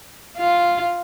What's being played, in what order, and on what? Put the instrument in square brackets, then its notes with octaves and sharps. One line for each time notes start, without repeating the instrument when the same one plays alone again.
[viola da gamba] F4